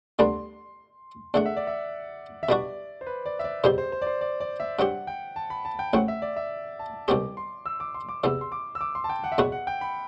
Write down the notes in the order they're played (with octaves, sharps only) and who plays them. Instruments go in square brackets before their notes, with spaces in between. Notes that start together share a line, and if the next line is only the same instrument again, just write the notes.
[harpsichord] D2 D3 G3 B3 D4 [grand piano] C6
[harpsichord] E2 D3 A3 D4 [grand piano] F#5
[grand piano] E5
D5
E5
E5
[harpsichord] B2 G3 D4 F#4 [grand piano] D5
[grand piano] C5
B4
D5
E5
D5
[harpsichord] E2 B2 G3 C4 G4 [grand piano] C5
[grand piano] C5
C5
D5
C5
D5
D5
E5
[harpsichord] G2 F#3 C4 G4 [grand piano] F#5
[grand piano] G5
A5
B5
A5
G5
[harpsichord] A1 A2 F#3 C4 [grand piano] F#5
[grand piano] E5
D5
E5
A5
[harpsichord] C2 B2 F#3 C4 G4 [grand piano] D6
[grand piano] C6
E6
D6
C6
D6
[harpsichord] E2 C3 E3 B3 [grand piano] E6
[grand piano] C6
D6
E6
D6
C6
A5
G5
F#5
E5
[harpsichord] E2 B2 F#3 B3 F#4 [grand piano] F#5
[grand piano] F#5
G5
B5